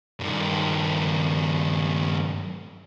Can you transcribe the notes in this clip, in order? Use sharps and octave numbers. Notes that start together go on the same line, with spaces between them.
G2 D#3